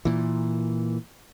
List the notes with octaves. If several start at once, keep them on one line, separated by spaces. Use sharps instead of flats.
A#2 E3